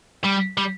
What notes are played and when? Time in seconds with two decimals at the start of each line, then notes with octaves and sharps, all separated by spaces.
0.25 G3
0.58 G3